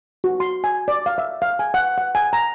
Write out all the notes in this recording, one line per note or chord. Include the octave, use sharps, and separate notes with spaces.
F#4
C6
G#5
D5
F5
E5
F5
G#5
F#5
F#5
G#5
A#5